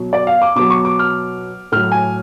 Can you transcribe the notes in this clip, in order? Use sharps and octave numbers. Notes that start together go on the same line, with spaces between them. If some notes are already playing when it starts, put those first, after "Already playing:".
Already playing: B2 F#3
D5
F5
D6
B2 F#3 D6
C#6
D6
F6
A2 F#3 F6
G#5